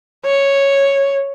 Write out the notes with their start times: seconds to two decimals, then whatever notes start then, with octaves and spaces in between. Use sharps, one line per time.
0.25 C#5